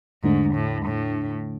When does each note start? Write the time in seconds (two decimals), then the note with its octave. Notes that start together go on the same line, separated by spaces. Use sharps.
0.23 E2 G#2 D3 A3 D4
0.55 A2
0.86 A2